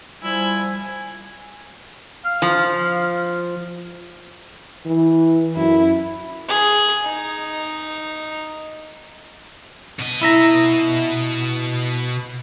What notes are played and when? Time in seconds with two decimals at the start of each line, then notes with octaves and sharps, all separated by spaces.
0.24 F3 G3 E4 G#5
2.25 F5
2.42 F3
4.86 E3
5.56 F#2 E4
6.48 G#4
7.06 D#4
10.00 B2 D#5
10.21 E4 E5 A#5